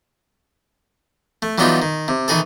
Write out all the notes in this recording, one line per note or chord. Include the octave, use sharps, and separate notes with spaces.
A3
E3 F#3 G3 B3 D#4 F4
D#3
C3
D#3 E3 D#4 G#4 A4